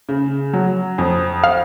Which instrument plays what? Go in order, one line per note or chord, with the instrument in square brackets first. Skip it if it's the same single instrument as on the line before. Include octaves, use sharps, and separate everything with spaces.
[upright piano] C#3
F#3
F2
[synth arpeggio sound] F5